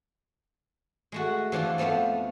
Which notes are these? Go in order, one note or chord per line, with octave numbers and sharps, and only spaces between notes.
G#3 A3 F#4
E3 F3 D4 F4
F2 F3 A3 B3 F5